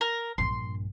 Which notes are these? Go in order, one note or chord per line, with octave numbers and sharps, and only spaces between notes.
A#4
A#1 G2 C6